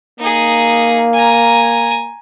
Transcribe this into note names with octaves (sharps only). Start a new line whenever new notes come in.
A#3 D#4 G#4
G#5 A#5